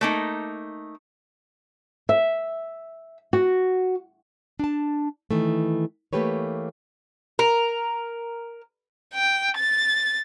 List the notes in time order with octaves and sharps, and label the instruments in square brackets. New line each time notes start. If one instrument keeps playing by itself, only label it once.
[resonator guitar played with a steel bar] A3 A#3 D#4
[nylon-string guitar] E5
F#4
D4 A5
D#3 E3 A3
E3 A3 A#3 G4 B4 C#5
[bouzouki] A#4
[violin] G5
A6